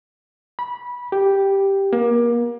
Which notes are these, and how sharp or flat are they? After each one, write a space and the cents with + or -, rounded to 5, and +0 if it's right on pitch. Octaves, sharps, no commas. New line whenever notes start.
B5 -20
G4 +0
A#3 +30